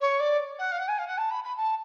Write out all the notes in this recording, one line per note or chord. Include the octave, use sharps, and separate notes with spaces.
C#5
D5
F#5
F5
F#5
G#5
F5
F#5
A5
B5
B5
A5